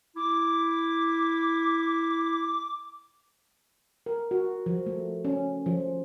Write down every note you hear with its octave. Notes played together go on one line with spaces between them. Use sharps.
E4 D6
A#4
F#4
F3
A3
C#4
F3